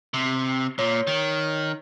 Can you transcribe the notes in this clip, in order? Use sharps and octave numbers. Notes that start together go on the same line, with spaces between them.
C3
A#2 C#5
D#3